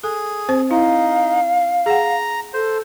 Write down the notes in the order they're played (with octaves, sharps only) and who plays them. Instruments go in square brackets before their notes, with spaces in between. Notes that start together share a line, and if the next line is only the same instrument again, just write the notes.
[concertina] G#4 [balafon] A4
[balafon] C4 C5
[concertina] D#4 [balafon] E4 [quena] F5
[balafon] G#4 F#5 [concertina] A#5
[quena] A4 [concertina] C5